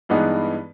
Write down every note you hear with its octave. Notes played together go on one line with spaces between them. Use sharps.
G2 E3 G#3 B3 D#4